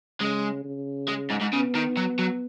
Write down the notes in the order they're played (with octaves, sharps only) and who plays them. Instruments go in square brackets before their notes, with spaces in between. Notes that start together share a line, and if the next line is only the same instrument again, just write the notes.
[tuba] C#3 [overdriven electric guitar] G#3
[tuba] C#3
[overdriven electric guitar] G#3
G#2
G#2
[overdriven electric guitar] C#3 [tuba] B3
[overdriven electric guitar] D#3
F#3
F#3